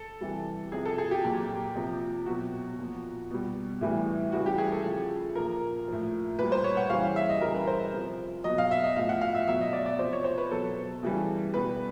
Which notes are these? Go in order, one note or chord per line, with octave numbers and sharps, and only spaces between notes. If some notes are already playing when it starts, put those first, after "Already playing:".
Already playing: A4
C3 E3 G3
C3 F3 G#4
A4
G#4
G4
A#2 F#3
C3 F3
B2 F#3 F#4
A#2 F3
B2 G3
A2 E3 G3
C#3 E3 G3 F#4
G4
G#4
A4
C#3 F3
A#2 F3 A#4
A2 F3
A#2 G3 B4
C5
C#5
F#5
C#3 E3 G3 F5
F5
E5
D#5
C#3 E3 G3 A#4
B4
C5
C3 F3
B2 F#3 D#5
F5
E5
D#5
A2 F3 F5
F#5
F5
E5
B2 F#3 E5
D#5
D5
D5
C3 F3 C5
C#5
C5
B4
B2 F#3 A4
C#3 E3 G3
B2 G3 B4